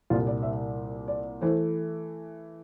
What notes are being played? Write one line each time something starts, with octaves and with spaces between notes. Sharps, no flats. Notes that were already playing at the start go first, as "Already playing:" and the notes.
C2 A#2 G3 F4
D5
E5
D5
E3 A3 C5